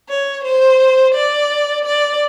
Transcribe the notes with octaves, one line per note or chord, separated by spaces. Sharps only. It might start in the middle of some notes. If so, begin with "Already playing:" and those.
C#5
C5
D5
D5